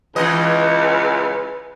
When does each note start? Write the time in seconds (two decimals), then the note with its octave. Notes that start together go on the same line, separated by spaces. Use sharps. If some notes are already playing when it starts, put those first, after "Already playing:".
0.16 C#2 E3 B4 D#5